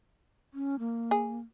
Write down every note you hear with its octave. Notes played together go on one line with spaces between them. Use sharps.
C#4
A#3
G#4